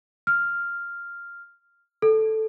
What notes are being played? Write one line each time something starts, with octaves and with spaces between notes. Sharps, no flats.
F6
A4